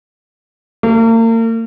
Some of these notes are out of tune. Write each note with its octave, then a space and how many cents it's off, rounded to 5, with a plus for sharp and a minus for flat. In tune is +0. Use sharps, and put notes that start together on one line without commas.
A#3 -40